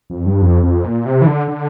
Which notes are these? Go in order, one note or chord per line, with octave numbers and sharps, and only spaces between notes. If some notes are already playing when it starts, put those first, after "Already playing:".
F2
G2
F2
F2
A#2
C3
E3
D3
D3